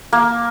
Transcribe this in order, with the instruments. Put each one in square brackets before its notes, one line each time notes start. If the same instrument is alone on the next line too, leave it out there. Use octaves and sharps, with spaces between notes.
[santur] A#3